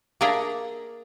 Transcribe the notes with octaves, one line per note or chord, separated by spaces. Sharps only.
A#3 D4 G#4 D5 E5 A#5